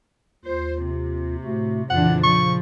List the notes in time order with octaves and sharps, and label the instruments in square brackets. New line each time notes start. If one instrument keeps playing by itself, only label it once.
[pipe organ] D#2 F4 [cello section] C5
[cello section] C3
[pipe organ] A2 A3 F#4
[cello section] F2 E3 D4 [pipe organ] A#2 C#3 F4 [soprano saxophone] F#5
[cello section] F3 [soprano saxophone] C#6